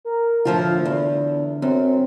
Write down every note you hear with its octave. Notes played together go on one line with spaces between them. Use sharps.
A#4
A2 D3 F3 F4
E2
F#2 C4